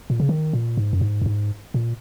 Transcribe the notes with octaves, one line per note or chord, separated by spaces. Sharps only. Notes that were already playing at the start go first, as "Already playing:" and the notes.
A#2
C#3
D#3
A#2
G#2
F#2
G#2
F#2
G#2
A#2